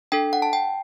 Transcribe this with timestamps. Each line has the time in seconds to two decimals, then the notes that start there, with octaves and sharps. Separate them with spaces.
0.12 D4 A4 G5
0.33 F#5
0.42 A5
0.53 G5